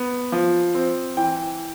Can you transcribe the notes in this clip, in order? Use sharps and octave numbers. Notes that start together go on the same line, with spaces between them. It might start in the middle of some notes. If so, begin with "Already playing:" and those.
Already playing: B3
F3
C4
E3 G5